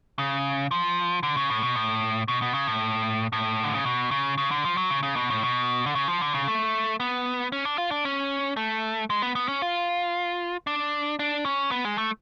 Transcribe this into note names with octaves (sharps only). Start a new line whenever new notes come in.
C#3
F3
D3
C#3
A2
B2
A2
B2
B2
C#3
A2
A2
D3
C#3
B2
C#3
C#3
D3
F3
F#3
C#3
C#3
B2
A2
B2
D3
C#3
F3
D3
C#3
A3
B3
C#4
D4
F4
D4
C#4
A3
G#3
B3
B3
C#4
F4
D4
D4
C#4
B3
G#3
A3